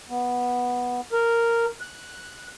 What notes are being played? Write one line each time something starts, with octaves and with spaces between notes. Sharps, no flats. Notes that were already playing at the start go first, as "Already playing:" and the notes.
B3
A#4
F#6